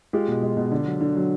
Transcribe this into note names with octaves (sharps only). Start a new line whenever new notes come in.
G#3 F4 G4
B2
G#3
B2
D3
F#3
D3
F#3